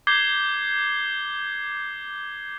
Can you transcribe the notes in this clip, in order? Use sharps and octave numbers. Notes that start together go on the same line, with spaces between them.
D6 G6 G#6 C7 G7